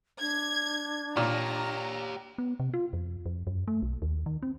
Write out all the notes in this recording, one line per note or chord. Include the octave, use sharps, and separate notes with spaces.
D4 G#6
A#2 G4 C#5 A#5
B3
C3
F4
F2
F2
F#2
A3
B1
D#2
D#3
C4